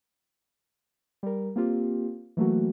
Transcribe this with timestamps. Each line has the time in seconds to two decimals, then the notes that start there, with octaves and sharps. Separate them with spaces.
1.23 G3 A#4
1.56 A#3 C4 F4 G4
2.37 E3 F#3 A3 A#3 F#4